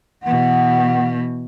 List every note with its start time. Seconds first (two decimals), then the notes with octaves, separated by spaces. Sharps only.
0.23 B2 E3 F#5